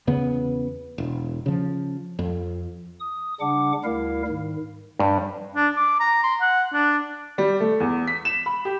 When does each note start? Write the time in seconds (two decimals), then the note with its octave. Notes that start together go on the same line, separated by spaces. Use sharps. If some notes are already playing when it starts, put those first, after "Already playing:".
0.07 E2 C#3 B3
0.98 E1
1.46 C#3 F3
2.19 F2
3.00 D#6
3.40 C#3 G3 D4 F#5 D6
3.84 D2 G3 E4 A#4 F5
4.28 G#2 D#3
4.99 G2
5.55 D4
5.76 D6
6.00 A#5
6.24 C6
6.41 F#5
6.73 D4
7.38 G3
7.60 A3
7.80 E2
8.08 B6
8.25 E7
8.46 B5
8.65 G4